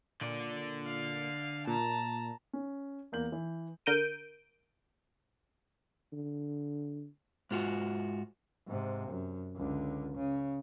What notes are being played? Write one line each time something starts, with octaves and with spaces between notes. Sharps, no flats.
A#2 D3 D5
F5
A#2 A5 A#5
C#4
E2 A#3 G6 F#7
E3
D3 A#4 G6 D7 D#7
D3
G#2 F4 F#4
G#2 C3
F#2
C#2 D3
C#3